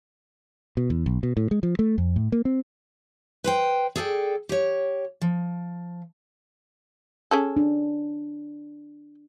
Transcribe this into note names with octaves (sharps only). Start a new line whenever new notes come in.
B2
E2
B1
B2
A2
G#3
F3
A3
F2
A2
A#3
C4
B4 C5 G5
G#4 A4 D5 E5 G5
G4 C#5
F3
C#4 G#4 A4
D4